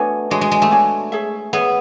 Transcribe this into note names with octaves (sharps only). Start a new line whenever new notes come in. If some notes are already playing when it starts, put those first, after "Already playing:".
Already playing: A3 B3 D4 F#4 C#5 G#5
G#3 D4 F#4 C#5 G#5
G#3
G#3
A3
D4 F#4 C#5 G#5
G#4 C#5 E5
B3 G#4 C#5 E5